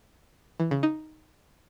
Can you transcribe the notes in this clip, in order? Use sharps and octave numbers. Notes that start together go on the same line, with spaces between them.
E3
C#3
D#4